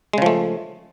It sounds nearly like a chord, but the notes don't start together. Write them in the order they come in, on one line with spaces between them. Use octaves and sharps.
G#3 C#3 F3 A3